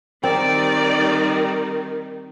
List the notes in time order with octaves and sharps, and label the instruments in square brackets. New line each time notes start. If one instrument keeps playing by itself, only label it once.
[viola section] D#3 G3 D#4 [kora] C4 [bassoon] A#4 [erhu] D5